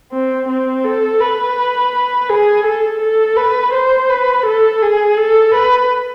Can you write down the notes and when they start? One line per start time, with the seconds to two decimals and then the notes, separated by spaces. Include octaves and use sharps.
0.12 C4
0.48 C4
0.85 A4
1.20 B4
2.29 G#4
2.65 A4
3.01 A4
3.37 B4
3.73 C5
4.10 B4
4.46 A4
4.82 G#4
5.17 A4
5.54 B4